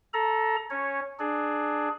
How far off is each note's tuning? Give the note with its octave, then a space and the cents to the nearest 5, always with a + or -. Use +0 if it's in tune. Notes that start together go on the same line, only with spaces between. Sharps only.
A4 +0 A#5 +20
C#4 +0 C#5 -10
D4 +20 G#4 +20